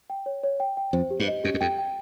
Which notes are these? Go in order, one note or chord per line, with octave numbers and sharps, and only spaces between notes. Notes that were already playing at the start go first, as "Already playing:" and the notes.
G5
C#5
C#5
G5
G5
F2 C5
G4
G2
D#5
F#2 G4
F#2
F2 G5
G5